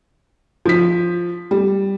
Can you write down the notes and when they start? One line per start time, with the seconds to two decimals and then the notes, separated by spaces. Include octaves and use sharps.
0.65 F3 B6
1.51 G3